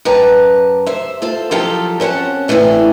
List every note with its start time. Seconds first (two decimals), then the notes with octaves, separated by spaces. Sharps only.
0.05 F#2 G4 B4 A5 A#5
0.86 C5 E5
1.22 F4 A4 C5
1.51 F3 F#3 F4 G4 A4
2.00 C4 C#4 C5 F#5 A5
2.48 A2 C3 D#3 E3 A3 D4